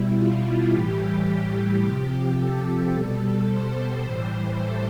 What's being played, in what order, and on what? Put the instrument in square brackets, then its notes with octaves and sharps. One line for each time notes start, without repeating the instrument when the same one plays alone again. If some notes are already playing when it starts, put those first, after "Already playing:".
Already playing: [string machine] B2 G3 E4
F4
A2 E3 G3 G4
G4
C3 F3
A4
B2 G3
C5
A2 E3 G3
A4